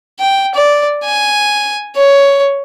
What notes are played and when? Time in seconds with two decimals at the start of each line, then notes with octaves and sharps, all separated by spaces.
0.20 G5
0.55 D5
1.04 G#5
1.96 C#5